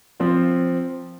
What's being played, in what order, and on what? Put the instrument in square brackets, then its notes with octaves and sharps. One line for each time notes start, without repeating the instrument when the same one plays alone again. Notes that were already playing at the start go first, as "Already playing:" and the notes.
[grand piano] F3 C4 F4